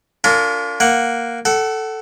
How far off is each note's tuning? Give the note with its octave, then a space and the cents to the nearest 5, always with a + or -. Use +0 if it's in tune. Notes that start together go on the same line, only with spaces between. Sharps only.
D4 -45 F4 +0 A#4 -40
A#3 +0 F#5 +0
A4 +0 F#5 +30